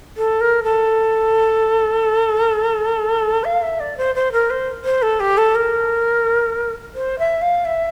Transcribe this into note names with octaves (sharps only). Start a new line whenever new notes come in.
A4
A#4
A4
F5
E5
D5
C5
C5
A#4
C5
C5
A4
G4
A4
A#4
C5
E5
F5
E5